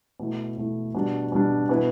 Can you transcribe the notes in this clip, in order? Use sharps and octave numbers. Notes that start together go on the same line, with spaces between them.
B2 A3 E4
B2 A3 E4
B2 G3 D4
B2 G3 D4
B2 B3 E4 B4